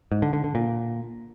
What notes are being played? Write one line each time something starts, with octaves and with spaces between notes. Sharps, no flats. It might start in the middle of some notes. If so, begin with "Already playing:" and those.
G#2
D3
D3
D3
A#2